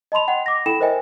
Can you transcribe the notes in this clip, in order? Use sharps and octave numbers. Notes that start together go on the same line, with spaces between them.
D#5 A5 B5 C6 F7
D#5 F#5 G5
D6 A#6
E4 A4 G5 B5 E7
A#4 C5 D#5 E5 G5 G#5